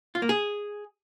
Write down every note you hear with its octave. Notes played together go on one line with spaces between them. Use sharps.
F4
A#3
G#4